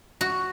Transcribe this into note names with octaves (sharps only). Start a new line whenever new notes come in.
F#4